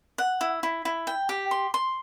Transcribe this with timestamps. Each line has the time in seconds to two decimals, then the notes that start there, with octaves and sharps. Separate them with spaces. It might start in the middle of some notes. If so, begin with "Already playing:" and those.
0.18 F#5
0.41 E4
0.63 E4
0.85 E4
1.07 G5
1.29 G4
1.51 C6
1.74 C6